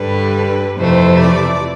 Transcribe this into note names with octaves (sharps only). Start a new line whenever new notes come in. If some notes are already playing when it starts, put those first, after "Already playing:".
Already playing: G2 D3 G3 B4
F2 C3 E3 A3 C5
D5